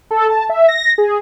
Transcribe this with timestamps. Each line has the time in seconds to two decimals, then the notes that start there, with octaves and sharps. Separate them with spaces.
0.11 A4
0.29 A5
0.49 E5
0.68 A#6
0.98 G#4